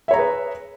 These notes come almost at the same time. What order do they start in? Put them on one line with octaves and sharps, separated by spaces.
E5 C#5 A#5 G#4 B4